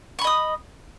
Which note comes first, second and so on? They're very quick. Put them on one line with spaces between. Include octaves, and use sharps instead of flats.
C#6 B5 D#5 D#6